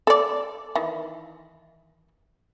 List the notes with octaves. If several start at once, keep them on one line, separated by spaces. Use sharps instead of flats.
A4 D5
D#3 E3